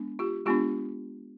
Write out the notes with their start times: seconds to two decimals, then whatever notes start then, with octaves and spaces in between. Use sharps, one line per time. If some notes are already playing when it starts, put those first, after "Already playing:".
Already playing: G#3 B3 D4
0.19 F4 G4
0.46 G#3 B3 D4 F4 G4